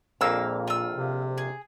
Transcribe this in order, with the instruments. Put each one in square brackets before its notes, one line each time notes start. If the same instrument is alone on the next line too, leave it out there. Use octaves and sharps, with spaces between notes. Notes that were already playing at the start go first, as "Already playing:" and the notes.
[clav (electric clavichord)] A#1 F2 A#3 [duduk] A#2 [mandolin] F5 E6
[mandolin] F4 E6
[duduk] C3
[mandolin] G#4